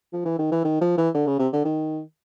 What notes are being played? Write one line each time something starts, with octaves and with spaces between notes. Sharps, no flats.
F3
E3
D#3
E3
D#3
F3
E3
D3
C#3
C3
D3
D#3